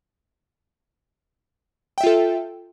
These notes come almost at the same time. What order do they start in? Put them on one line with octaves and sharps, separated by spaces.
G5 E5 F4 A4